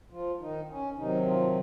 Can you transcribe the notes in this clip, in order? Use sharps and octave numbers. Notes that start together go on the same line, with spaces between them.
F3 F4
D#3 D#4
C#4
C3 D#3 F#3 D#4
F3 F4